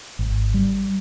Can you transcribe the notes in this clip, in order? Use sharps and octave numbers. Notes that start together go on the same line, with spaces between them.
G#1
G3